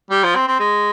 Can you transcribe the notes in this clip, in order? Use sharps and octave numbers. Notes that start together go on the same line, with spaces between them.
G3
F3
C4
C4
G#3